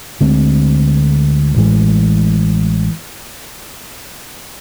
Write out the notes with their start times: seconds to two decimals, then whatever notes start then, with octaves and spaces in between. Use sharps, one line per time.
0.21 D2 D3 G#3 C4
1.56 A1 A2 E3 G#3